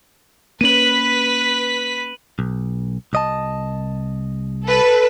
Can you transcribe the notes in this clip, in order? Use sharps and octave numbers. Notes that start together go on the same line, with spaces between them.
A#3 C#4 B4 B6 D#7 F#7
B1
C2 D#5 A5
A4 B4